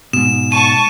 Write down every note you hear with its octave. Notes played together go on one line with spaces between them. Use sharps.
G#2 B2 E7
A5 C#6 D#7